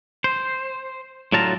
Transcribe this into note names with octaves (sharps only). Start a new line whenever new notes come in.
C5
A2 D3 F#3 F4 A5 A#5